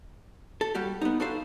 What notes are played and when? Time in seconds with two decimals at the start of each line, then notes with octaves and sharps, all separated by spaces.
0.61 A4
0.75 G3 F#4 G4
1.02 B3 D#4
1.20 D4 F#4 A4 C5 F5